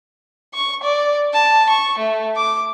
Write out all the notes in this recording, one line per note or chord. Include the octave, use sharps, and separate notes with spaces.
C#6
D5
A5
C#6
A3
D6